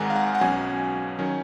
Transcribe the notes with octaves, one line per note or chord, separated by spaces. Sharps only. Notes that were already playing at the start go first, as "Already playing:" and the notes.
Already playing: G#1 G#2 D#3 G#3 F#5 G#5 A#5
F5
F#5
F#5
B1 B2 F#3 C#4 G#5
D#3 F#3 C#4